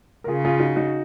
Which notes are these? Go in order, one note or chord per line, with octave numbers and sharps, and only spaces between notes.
A#4
C#3 F4 G#4
F4 G#4
D#4 F#4
D#4 F#4